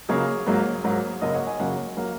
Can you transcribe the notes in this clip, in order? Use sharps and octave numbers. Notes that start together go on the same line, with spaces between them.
C#3 F#3 A#3 G#4 C#5
G#2 F#3 A#3
G#2 F#3 A#3
F#2 C#3 F#3 A#3 A#4 D#5
C#5 F#5
D#5 G#5
F#2 C#3 F#3 A#3 C#5 F#5
F#3 A#3